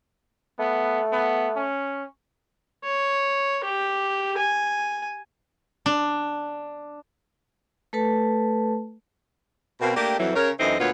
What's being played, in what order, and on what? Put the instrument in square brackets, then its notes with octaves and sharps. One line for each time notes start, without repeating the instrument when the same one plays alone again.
[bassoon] A3 [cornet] B3
[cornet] B3
C#4
[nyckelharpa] C#5
G4
G#5
[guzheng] D4
[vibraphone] A3 A4 B4 A5
[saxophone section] B2 A#3 C4
A3 A#3 D4 G4
F2 E3 F#3
C#3 A#4 C#5
F#2 E3 A3 C4 D#4 D#5
D2 A#2 B3 F4 B4 C#5